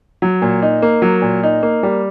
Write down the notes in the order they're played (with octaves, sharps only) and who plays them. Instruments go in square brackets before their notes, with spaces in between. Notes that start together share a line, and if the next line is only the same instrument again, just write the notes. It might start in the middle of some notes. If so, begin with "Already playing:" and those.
[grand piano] F#3
A#2
D#4
A#3
F#3
A#2
D#4
A#3
G3